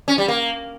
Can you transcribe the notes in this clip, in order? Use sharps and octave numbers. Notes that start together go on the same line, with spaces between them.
C#4
G3
A#3